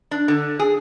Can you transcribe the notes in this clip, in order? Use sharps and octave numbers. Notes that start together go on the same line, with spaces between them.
D4
D3
G#4